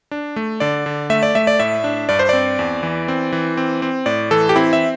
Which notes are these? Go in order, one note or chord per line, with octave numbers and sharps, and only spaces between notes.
D4
A3
D3 D5
D3
A3 E5
D5
A3 E5
D5
A2 E5
D4
G2 D5
C5
C4 D5
E2
E3
C4
E3
C4
C4
A2 D5
E3 A4
G4
C4 E4
E5